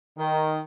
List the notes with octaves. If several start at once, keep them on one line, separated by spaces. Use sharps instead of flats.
D#3